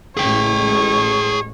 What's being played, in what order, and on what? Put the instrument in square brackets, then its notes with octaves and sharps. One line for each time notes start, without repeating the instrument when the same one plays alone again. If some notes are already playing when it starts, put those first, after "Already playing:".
[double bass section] A1 G#3 [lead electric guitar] G#4 G5 [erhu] C#5